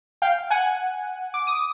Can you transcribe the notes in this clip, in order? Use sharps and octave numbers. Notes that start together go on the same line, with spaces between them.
F5 G5
F#5 G#5
D6
D#6